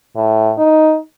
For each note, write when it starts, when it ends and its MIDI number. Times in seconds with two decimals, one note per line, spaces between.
0.16 0.52 45
0.58 0.97 63